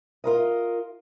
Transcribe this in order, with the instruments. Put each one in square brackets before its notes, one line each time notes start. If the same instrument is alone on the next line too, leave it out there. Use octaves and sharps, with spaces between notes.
[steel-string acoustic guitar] F4 A#4 D#5